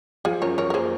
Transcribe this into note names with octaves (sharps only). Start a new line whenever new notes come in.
F3 F4 G#4
F#2 A#4 C#5
F#2 A#4 C#5
A#4
A#3 G#4 C5